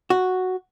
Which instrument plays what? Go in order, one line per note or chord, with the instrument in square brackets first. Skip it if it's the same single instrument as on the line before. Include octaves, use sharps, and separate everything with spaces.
[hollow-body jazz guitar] F#4